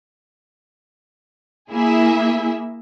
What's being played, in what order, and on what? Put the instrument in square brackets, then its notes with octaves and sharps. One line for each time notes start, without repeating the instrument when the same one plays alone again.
[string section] A#3 E4 G#4 E5